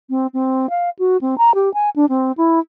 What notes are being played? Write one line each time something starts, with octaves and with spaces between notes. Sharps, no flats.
C4
C4
F5
F#4
C4
A#5
G4
G#5
D4
C4
E4